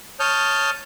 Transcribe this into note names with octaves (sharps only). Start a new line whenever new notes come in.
C#5 A5 D#6 F6 G6